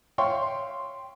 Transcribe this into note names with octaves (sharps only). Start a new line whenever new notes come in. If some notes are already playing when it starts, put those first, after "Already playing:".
C#5 E5 F5 G5 C6 C#6